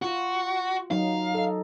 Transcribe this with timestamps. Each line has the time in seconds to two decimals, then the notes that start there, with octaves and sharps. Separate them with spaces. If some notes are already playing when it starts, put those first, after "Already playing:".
0.02 F4 F#4
0.91 F#3 D#4 F5
1.35 A4 D#5